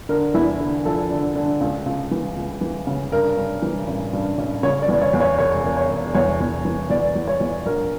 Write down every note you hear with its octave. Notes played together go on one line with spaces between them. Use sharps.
D3 A#4
E2 E4
D3
F3 A4
D3
D3
C#2
C#2
E3
C#2
E3
C#3
G2 A#4
G2
E3
A1
G2
A1
C#3 C#5
D5
E2
C#5
E2
C#5
E1 C#5
E1
C#5
E1
E2 C#5
E2
E3
E2 D5
E2
C#5
E2
A#1 A#4